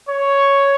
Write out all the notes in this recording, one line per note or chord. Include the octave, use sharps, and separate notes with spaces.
C#5